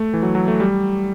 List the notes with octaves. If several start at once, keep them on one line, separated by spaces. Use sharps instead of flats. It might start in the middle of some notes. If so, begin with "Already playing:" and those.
Already playing: A3
E3
F#3
F#3
A3
G3